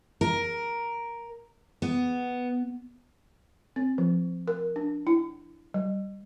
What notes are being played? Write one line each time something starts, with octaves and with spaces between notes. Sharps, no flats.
A#4
B3
C4
F3
A#4
D4
E4
G3